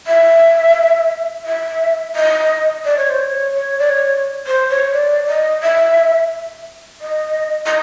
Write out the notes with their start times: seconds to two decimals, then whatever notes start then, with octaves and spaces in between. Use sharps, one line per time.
0.07 E5
1.46 E5
2.16 D#5
2.85 D5
2.97 C#5
3.09 C5
3.21 C#5
3.54 C#5
3.79 D5
3.89 C#5
4.47 C5
4.70 C#5
4.93 D5
5.28 D#5
5.63 E5
7.01 D#5
7.66 D#5